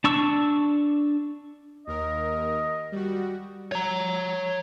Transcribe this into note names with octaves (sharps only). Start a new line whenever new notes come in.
D4 A5 C#6 E6
D#2 A#4 D#5
G3 F#4
C#5 A#5